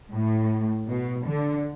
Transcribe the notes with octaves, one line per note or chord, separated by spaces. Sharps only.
A2
B2
D3